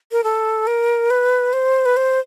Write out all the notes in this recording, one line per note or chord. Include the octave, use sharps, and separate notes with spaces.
A#4
A4
A#4
B4
C5
B4
C5